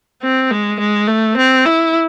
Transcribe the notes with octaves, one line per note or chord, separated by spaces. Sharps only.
C4
G#3
G#3
A3
C4
E4